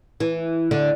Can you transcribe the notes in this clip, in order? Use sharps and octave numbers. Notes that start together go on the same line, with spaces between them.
E3
D3